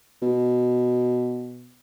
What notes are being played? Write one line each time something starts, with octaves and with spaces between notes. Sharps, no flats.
B2